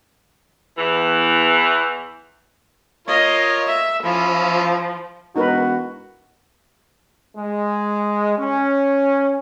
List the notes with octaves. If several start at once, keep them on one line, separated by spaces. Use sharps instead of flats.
E2 E3
F4 A#4 C#5 D#5
E5
F3 C#4 E4 F4
E1 D#4 F#4 A#4 B4
G#3
C#4